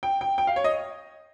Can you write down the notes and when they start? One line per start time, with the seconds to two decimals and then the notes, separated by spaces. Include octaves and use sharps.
0.03 G5
0.21 G5
0.38 G5
0.47 F5
0.56 C#5
0.64 D#5